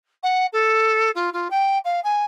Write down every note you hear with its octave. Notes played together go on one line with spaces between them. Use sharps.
F#5
A4
F4
F4
G5
F5
G#5